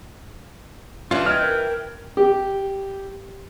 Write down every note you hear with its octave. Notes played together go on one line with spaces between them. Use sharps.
E3 G3 C#4 D4 E4 F4
D#5 G5 F6 G#6
A#4
G4